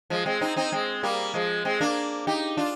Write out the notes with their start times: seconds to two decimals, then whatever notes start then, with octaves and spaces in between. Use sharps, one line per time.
0.10 F3 G#3
0.26 G#3 C4
0.41 C4 D#4
0.56 C4 D#4
0.72 G#3 C4
1.03 G3 A#3
1.34 F3 G#3
1.65 G#3 C4
1.81 A#3 D4
2.27 D#4 G4
2.57 D4 F4